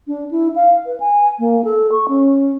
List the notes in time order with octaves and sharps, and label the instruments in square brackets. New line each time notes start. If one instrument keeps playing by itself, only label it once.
[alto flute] D4
E4
F5
B4
G#5
A#3
A4
C#6
C#4